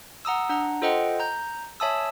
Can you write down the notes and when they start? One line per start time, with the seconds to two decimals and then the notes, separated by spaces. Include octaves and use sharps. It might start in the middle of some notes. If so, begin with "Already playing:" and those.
0.25 F#5 A#5 D#6 E6
0.49 D4 F#5 A#5
0.82 F4 A4 C5 D#5 F#5 G5
1.20 A#5 G6
1.80 C#5 E5 G#5 A5 D#6 E6